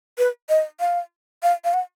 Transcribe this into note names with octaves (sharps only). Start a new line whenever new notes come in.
B4
D#5
F5
F5
F5
F#5